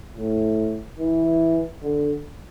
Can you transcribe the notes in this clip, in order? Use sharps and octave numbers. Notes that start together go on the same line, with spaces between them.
A2
E3
D3